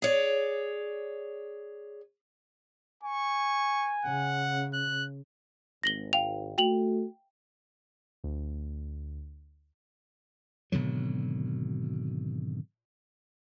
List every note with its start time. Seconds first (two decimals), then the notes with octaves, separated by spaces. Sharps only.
0.02 G#4 C#5 D5
3.04 G#5 C#6
4.05 C#3 F#5
4.74 F#6
5.83 G#1 A#6 F#7 G7
6.13 F5 G5 F7
6.58 A3 F#4 G5 F7 F#7
8.24 D2
10.72 G#1 B2 D3 F#3